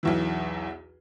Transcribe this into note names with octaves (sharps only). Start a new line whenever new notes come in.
B1 E2 E3